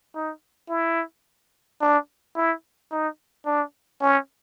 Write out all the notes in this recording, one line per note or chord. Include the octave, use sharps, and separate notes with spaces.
D#4
E4
D4
E4
D#4
D4
C#4